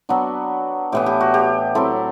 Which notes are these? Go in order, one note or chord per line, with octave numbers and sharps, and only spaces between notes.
F#3 B3 D4 F#4
A2 E3 B3 G4
G4
F#4
G4
F#3 C4 E4 A4